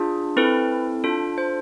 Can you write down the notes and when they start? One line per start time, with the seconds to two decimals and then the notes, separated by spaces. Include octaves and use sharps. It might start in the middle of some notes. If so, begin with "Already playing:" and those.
Already playing: D4 F4 G#4
0.37 C4 E4 A4 B4
1.04 D4 F4 A4
1.38 C5